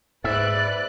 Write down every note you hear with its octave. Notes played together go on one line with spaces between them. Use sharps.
G#2 B4 D5 E5 F#6 A6